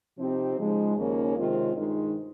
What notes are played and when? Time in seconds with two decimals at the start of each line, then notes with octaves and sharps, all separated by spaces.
0.17 C3 F3 C4 D#4 G4
0.56 C#3 F3 G#3 D#4
0.97 D#2 C#3 F3 A#3 C#4
1.37 C3 D#3 G#3 C4 F4
1.76 G2 D#3 G#3 D#4